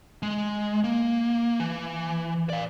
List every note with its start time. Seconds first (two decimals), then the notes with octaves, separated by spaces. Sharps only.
0.23 G#3
0.84 A#3
1.60 E3
2.50 D5 F5